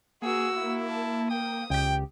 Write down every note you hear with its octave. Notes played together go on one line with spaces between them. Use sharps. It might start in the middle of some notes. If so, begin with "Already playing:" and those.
A#3 F#4 G#4 E6
E4
A5
G5 D#6
C#2 G4 G5